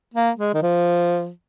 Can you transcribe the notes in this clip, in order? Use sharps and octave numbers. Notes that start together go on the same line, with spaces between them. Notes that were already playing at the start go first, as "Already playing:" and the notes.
A#3
G#3
D#3
F3